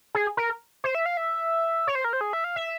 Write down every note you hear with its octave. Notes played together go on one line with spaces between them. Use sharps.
G#4
A#4
C5
E5
F5
E5
C#5
C5
A#4
C5
G#4
E5
F5
E5